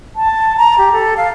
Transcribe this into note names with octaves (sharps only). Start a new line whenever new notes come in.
A5
A#5
G4
A4
F5